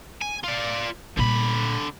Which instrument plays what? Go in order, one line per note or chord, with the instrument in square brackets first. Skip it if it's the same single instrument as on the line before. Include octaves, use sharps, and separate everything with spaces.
[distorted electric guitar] G#5
F4 D5
[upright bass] A#2 G3 [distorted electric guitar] D3 B5